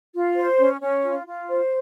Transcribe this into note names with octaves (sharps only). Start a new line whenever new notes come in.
F4
C5
C#4
C#4
F4
F4
C5